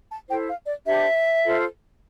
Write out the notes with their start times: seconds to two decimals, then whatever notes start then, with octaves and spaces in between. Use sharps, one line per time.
0.10 A5
0.29 E4 A4 C5 G5
0.48 F5
0.67 D5
0.86 D4 G4 C5 E5
1.44 F4 A4 C5